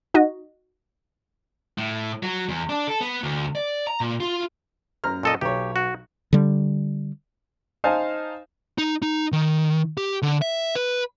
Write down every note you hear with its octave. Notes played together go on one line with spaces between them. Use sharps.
D#4 F#4 D#5
A2
F#3
E2
D4
A4
B3
D2
D5
A#5
A#2
F4
F#2 A#5 F6
A#2 A4 D#5
B1 G4 C#5
F#4
D3 G3
D#4 C5 F5 G#5 A5
D#4
D#4
D#3
G4
D3
E5
B4